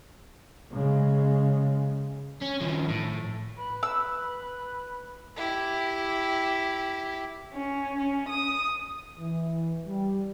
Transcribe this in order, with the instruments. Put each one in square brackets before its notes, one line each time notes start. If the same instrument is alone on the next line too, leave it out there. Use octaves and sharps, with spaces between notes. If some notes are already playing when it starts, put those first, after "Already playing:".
[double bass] C#3 G#3
[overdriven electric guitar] C#4
D#3 F3
A2
[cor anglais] B4
[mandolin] E6
[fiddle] E4 G4
[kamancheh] C#4
C#4
D#6
[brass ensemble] E3
G3